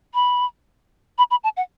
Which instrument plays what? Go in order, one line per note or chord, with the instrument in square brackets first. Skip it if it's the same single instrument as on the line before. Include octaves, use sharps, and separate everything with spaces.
[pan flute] B5
B5
B5
A5
F#5